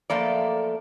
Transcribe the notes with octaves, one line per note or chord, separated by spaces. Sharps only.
F#2 F3 A3 A#3 D5